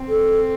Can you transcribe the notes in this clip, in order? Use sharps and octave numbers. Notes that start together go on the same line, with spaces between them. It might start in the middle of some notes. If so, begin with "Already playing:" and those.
Already playing: C4
A4